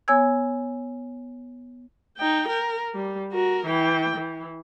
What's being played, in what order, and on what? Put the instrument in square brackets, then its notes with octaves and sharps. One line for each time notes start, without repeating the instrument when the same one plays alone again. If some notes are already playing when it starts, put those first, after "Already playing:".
[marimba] B3 C#5 G#5 E6 G#6
[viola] D#4 G5
A#4
G3
F#4 A#4
E3 G5
E3